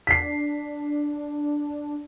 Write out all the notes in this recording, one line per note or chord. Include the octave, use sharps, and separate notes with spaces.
D4 B6 C7